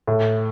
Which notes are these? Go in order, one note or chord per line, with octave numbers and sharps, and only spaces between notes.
A2